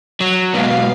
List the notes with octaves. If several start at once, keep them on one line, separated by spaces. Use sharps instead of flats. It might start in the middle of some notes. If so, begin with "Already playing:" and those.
F#3
G#2 B2 B3 F5